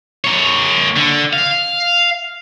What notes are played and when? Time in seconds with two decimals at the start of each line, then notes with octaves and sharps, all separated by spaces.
0.24 A#3 C#5
0.96 D3
1.33 F5